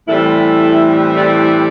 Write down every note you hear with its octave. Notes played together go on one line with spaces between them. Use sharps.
A2 E3 G3 C4 E4 A4
A4 D5